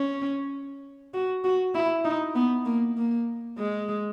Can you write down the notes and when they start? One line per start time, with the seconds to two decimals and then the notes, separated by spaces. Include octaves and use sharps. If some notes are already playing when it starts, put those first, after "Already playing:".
Already playing: C#4
1.14 F#4
1.44 F#4
1.74 E4
2.05 D#4
2.35 B3
2.66 A#3
2.97 A#3
3.58 G#3